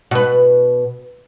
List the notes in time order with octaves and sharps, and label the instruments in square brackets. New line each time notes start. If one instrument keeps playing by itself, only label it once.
[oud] B2 B4